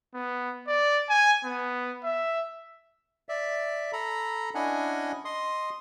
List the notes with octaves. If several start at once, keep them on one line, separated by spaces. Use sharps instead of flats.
B3
D5
G#5
B3
E5
D5 E5
A4 A#5 B5
C#4 D4 E4 D#5 F#5 G#5
D#5 C6 D#6